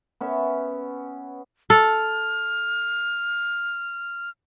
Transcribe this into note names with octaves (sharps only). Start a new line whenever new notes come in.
B3 C#4 E5
A4 F6